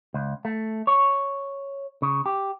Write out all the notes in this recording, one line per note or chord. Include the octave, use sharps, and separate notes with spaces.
C#2
A3
C#5
C#3
G4